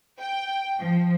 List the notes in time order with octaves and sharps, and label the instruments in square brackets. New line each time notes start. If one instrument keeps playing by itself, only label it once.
[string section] G5
F3